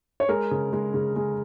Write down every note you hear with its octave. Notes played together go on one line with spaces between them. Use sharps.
C#5
G#3 A#4
C#3
G#3
C#3
G#3